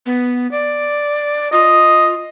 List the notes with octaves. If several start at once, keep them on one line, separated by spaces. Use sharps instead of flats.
B3
D5
F4 D#5